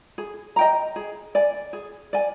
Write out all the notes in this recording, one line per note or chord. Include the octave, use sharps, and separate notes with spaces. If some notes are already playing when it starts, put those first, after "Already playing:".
G#4
D#5 G5 A#5
G#4
D5 G#5
G#4
D5 G#5